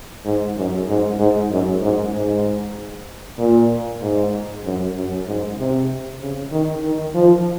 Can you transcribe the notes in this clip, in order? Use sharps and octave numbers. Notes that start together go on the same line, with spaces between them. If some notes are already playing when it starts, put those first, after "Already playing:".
G#2
F#2
G#2
G#2
F#2
G#2
G#2
A#2
G#2
F#2
F#2
G#2
C3
C#3
D#3
D#3
F3